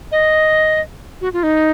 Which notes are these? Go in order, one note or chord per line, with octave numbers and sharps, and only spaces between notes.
D#5
F#4
F4
D#4